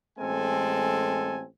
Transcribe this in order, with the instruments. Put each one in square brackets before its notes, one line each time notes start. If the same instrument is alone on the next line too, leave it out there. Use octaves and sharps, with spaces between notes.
[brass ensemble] A1 G#3 C4 A4 G#5